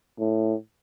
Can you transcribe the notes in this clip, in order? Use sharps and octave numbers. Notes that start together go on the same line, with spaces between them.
A2